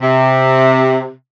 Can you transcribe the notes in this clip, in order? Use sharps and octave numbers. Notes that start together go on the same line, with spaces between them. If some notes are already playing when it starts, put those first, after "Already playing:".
C3